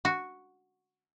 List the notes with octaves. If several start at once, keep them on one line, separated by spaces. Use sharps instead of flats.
F#4